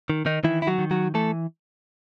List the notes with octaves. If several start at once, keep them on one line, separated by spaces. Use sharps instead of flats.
D#3
D#3 D#4
D#3 E3 E4
E4
F#3 F#4
D#3
F#3 F#4
E3 A3 A4